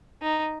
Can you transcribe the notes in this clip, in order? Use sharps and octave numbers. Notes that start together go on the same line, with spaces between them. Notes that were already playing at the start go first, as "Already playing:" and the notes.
D#4